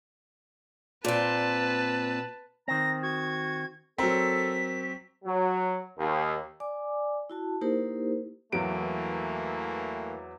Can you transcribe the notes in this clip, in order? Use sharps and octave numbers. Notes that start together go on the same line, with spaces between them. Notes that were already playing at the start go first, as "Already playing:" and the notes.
A#2 C4 B4 A5
D#3 C4 A#5 A#6
F#4 G#6
F#3 C4 A4 A#4 B6
F#3
D#2
D5 G#5 D6
E4 F#4 A5
A#3 D#4 E4 G4 A#4 C5
E2 E3 F#3 A3 A#3 D7